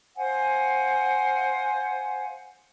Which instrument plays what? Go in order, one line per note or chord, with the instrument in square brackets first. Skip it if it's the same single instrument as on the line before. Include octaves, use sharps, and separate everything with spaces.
[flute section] C5 F5 F#5 G#5